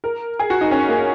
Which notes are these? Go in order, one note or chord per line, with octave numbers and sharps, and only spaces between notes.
A#4
G#4
F#4
D#4
C#4
A#3